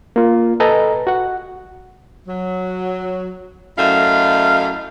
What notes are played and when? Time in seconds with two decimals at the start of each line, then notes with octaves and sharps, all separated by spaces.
0.16 A#3 F4
0.60 A4 B4 D#5 G#5 A#5
1.07 F#4 F#5
2.28 F#3
3.78 F#2 A3 E4 D#5 F5